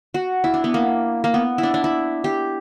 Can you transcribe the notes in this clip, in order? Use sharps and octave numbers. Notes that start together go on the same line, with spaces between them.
F#4
E4
D4
B3
A#3
A#3
B3
E4
D4
D4
E4
G4